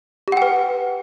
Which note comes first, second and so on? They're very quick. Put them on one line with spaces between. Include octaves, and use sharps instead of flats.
G4 F#5 G5 B4